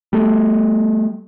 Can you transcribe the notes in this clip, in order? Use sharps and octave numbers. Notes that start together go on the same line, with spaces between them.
G3 A3